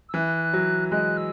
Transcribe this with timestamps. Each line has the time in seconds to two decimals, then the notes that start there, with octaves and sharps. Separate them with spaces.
0.09 E6
0.14 E3 F#6
0.53 F#3
0.91 G#3 F#6
1.17 E6